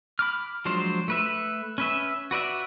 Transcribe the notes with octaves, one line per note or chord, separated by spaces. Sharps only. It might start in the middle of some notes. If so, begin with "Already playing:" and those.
B5 D6 F6
F3 F#3 G#3 D4 C5
A3 B4 E5
C#4 B4 E5
F#4 B4 D5 E5